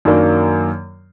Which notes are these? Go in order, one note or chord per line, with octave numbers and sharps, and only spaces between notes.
F#2 D#3 F#3 A#3 D4